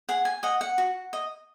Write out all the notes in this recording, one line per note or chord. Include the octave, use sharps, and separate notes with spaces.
G#4 F#5
G#5
D#5 F#5
F#5
F#4
D#5